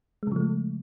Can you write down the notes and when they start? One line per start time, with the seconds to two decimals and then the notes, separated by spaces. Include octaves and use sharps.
0.23 G#3
0.27 C#3
0.32 F3
0.36 A3